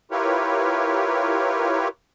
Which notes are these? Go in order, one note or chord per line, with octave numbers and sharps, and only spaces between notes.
E4 F4 G4 A#4 B4 C#5